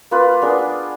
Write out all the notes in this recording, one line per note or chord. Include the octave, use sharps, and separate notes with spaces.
A#3 F4 B4
B3 D4 G#4 A#4